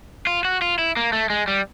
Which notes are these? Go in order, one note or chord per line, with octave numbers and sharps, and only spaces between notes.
F4
F#4
F4
E4
A#3
A3
G#3
G3